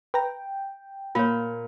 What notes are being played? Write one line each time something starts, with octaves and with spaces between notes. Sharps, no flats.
B4 G5 A#5
A#2 F4 C#5